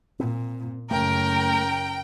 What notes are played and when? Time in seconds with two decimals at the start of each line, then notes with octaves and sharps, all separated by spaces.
0.20 A#2 C4
0.91 F#1 A3 C#4 A#4 G5